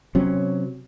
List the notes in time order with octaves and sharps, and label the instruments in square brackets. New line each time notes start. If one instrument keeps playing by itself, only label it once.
[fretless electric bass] C3 F#3 C#4